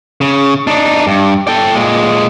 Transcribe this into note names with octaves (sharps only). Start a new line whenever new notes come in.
C#3
D4 D#4
G2
A4 G5
A#2 G#3